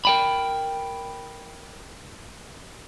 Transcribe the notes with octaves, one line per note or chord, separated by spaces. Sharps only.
A#4 G5 B5